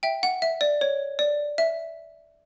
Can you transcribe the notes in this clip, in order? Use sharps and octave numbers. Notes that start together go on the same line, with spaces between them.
E5 G5
F#5
E5
D5
C#5
D5
E5